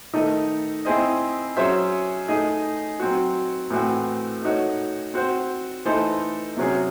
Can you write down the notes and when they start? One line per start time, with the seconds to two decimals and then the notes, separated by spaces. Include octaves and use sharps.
0.13 D#3 A3 D#4 A4 D#5
0.85 C4 E4 G#4 C5 D#5
1.57 F#3 C#4 G#4 C5 E5
2.28 A3 D#4 G#4 D#5
3.00 F#3 C4 F#4
3.70 A2 E3 C4 F#4
4.42 A3 D#4 F#4 C#5
5.14 C4 F#4 C5
5.85 E3 A3 D#4 A4 C5
6.57 C3 F#3 C#4 G#4